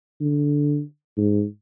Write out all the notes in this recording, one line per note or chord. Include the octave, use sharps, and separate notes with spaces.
D3
G#2